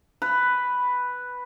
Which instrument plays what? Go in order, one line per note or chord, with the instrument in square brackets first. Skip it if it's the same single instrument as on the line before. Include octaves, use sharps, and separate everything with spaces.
[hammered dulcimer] B4